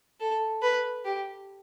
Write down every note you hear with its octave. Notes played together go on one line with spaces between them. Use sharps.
A4
B4
G4